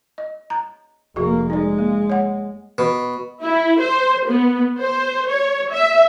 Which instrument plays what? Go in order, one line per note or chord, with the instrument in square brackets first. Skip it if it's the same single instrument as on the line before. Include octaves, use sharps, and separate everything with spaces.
[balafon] D#5
A#5
[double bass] F1 A#3 [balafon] F#4 G#4
[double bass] G#3 [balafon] D#4 D5
[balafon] A#3
C#5 F#5
[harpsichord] B2
[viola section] E4
C5
B3
C5
C#5
E5